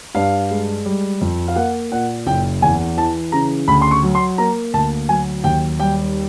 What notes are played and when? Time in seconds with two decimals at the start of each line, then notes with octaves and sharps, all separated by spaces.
0.15 G2 F5
0.50 G#3
0.85 G3
1.21 F2
1.48 F5
1.56 A#3 F#5
1.92 A#2 F#5
2.27 F#1 G5
2.62 E2 G#5
2.97 E3 A5
3.32 C#3 A#5
3.68 D2 B5
3.82 C6
3.91 C#6
4.03 F#3
4.15 C6
4.38 A#3 A#5
4.74 D2 A5
5.09 F#3 G#5
5.44 D#2 G5
5.79 G3 G5